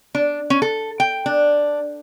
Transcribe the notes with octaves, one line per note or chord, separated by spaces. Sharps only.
D4
C#4
A4
G5
D4